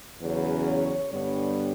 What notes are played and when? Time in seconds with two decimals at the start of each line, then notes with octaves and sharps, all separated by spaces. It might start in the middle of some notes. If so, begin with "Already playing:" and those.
0.22 E2 C#3 F#3 C#4 B4
0.67 C#5
1.12 G2 D3 G3 B3 C#5